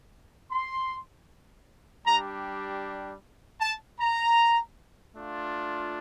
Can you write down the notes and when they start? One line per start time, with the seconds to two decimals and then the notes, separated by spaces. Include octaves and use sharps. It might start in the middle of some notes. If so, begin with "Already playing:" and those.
0.51 C6
2.06 G3 D4 G4 A#5
3.61 A5
4.00 A#5
5.16 A3 D4 F4